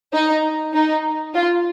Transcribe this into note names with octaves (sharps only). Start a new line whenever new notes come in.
D#4
D#4
F4